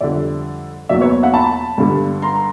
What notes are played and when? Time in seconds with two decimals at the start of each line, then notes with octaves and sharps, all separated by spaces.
0.01 F2 D3 G3 D5 E5
0.89 E2 B2 F#3 A#3 D5 E5
1.01 B4 C#5
1.23 E5 F#5
1.34 A5 B5
1.78 G2 D3 G3
2.22 A#5 C6